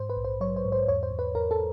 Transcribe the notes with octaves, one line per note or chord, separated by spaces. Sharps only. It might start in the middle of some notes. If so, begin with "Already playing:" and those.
Already playing: G#2 C5
B4
A#1
C5
F#3 C#5
C5
G#2
C5
E2 C#5
C5
E2
B4
E2 A#4
A4